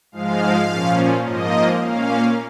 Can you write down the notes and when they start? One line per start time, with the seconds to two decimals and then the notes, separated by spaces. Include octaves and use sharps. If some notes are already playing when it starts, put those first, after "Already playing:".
0.12 G#2 F3 G#3 F5
0.67 A#2 F3 C#4
1.24 G#2 F3 A#3 D#5
1.80 A#2 A#3 C#4 F5